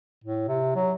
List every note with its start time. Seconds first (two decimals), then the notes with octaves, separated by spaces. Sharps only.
0.24 A2
0.48 C3
0.75 F#3